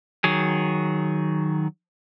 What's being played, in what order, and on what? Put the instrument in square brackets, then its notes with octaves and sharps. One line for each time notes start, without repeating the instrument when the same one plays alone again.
[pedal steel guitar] D#3 F#3 G#4